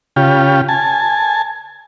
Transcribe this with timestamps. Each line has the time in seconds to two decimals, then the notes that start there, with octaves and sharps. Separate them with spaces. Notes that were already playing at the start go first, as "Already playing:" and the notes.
0.16 C#3 F4 G4
0.69 G#5 A5